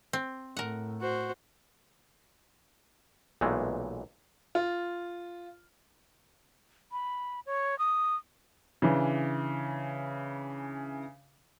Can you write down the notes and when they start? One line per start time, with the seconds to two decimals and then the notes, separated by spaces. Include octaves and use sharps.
0.13 C4
0.57 A2 A3 A#4 F#5
1.01 F#4 C5
3.41 B1 A#2 E3 G#3 A3
4.55 F4
6.92 B5
7.46 C#5
7.79 D#6
8.82 C#3 E3 D4